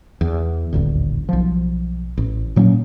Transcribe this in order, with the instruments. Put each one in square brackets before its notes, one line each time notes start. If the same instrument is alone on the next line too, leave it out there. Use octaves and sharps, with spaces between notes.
[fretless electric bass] E2
D#1 A1 D2
B1 F3
A1
A#2 F#3 A#3 C#4